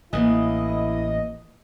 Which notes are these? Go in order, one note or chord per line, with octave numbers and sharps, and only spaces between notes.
A1 A2 A#3 E4 B4 D#5 G#5